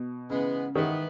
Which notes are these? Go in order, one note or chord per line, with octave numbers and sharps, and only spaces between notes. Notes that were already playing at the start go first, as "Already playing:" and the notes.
Already playing: B2
G#2 C#3 E3 G#3 B3
G#2 D#3 E3 B3